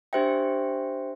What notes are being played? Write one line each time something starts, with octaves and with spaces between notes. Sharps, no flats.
D4 G4 C5 E5 G5